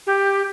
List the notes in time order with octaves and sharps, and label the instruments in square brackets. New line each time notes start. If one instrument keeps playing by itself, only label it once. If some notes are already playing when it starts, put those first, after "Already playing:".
[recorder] G4